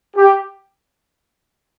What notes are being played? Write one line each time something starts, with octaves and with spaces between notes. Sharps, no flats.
G4